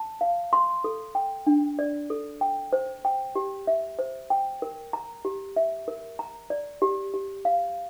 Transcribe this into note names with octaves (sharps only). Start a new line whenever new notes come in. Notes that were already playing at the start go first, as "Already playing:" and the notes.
Already playing: A5
F5
C6
A4
G5
D4
D5
A4
G5
C5
G5
G4
E5
C5
G5
A#4
A#5
G4
E5
A#4
A#5
D5
G4
G4
F5